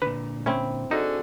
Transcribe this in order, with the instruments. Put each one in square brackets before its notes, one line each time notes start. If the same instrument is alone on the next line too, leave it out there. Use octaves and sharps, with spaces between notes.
[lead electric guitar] A#2 D3 [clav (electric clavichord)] B4
[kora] C4 E4 [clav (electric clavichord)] C#4
[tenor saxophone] D3 [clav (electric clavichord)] D#4 [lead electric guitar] F#4 G#4